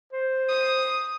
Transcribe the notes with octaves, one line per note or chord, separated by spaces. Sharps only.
C5
D#6